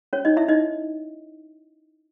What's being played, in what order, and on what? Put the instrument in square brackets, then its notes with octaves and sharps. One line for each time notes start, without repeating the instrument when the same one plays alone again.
[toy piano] C#4 C#5
D#4 D#5
E4 E5
D#4 D#5